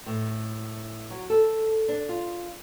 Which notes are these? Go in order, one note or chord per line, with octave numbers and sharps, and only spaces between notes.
A2
F#3
A4
D4
F4